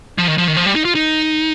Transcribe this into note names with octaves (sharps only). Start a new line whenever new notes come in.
F3
D#3
F3
D#3
F3
G3
D#4
F4
D#4